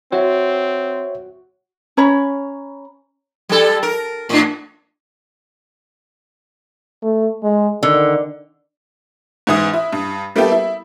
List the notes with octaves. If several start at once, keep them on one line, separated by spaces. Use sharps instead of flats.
C4 F#4 C#5 E5
C#4 C#5 A#5 B5
G3 A4
A#4
A2 D4
A3
G#3
D3 D#3
G#2 E3 D#6
E4
G2
G3 A#3 B3 E4 G4 A4
E4